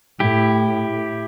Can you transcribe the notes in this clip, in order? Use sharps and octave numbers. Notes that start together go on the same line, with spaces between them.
A2 E4 G4